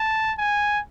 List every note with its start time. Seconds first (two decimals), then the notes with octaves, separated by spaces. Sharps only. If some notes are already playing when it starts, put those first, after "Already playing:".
Already playing: A5
0.38 G#5